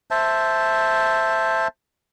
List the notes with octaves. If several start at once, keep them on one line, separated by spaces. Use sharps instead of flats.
C5 E5 A5